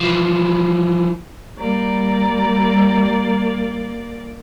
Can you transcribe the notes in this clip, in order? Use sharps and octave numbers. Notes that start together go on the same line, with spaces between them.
E3 F3
G3 A#3 D5 A#5